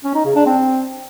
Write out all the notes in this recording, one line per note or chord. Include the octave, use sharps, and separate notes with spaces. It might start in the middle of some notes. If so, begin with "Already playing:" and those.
C#4
D#4
C#3
D4
C4